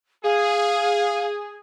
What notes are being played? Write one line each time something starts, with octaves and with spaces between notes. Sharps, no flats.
G#4 F5